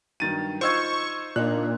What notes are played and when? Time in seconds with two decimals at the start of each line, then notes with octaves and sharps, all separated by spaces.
0.20 G2 D#3 F#3 A6 D#7
0.61 D#4 F4 C5 C#6 E6 G#6
1.36 A#2 D4 D#4 F#6